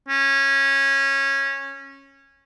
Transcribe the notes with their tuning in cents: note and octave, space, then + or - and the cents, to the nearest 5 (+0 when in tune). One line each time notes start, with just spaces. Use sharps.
C#4 -15